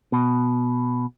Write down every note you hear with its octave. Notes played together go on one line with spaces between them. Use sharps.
B2